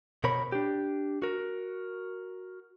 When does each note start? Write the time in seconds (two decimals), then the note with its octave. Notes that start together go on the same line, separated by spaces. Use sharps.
0.24 B2 A#4 C5 C#5 B5
0.52 D4 G4
1.22 F#4 A#4